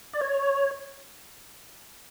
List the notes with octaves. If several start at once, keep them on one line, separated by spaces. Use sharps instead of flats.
D5
C#5